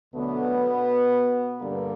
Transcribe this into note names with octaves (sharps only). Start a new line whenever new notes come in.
D2 B2 D3 F#3 A3 B3
G2 D3 G3 A#3